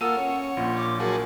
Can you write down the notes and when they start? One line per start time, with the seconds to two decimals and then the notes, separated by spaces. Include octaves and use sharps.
0.01 A#3 F4 A4 A#4 F#5 D#6 E6 D#7
0.17 C#4 C#5
0.57 A#1 A#2 F4
0.77 D6
1.00 F#3 F#4 G#4 A#4 A5